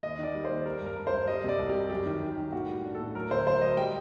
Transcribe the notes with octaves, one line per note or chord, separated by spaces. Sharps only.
D#2 D#5
D#3 D5
G3
D#2 C5
G3 A#4
G2
A#4
G2
C5
G2
G3 D#5
C3 D5
C2
G4
G3
F#2 G4
D#3
F#2
D#3
A2 F#4
G3
D4
A4
A2
F#3 A#4
D2 C5
F#3 C5
F#3 D#5
G3 G5